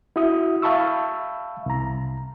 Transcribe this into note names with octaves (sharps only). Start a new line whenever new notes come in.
E4 F#4 E5 D#6
E5 F5 A5 B5 C#6 E6
C2 A#5